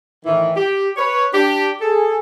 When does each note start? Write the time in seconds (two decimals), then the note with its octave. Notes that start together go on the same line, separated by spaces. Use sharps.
0.24 A2 D#3 E3
0.55 G4
0.97 B4 C#5
1.33 D4 G4
1.80 G#4 A4